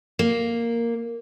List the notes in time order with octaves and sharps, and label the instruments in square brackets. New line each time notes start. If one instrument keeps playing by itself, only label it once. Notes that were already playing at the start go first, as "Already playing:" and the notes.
[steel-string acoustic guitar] A#3